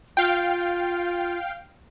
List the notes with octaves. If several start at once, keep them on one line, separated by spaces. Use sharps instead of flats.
F4 F5 G5